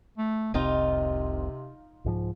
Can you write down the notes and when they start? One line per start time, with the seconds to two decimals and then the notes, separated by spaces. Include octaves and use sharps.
0.18 A3
0.54 F1 C2 C3 C4 D#4 F4
2.04 C2 G#2 F3